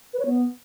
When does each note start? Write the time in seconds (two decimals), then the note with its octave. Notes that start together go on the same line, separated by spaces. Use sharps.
0.13 B4
0.20 C#5
0.26 B3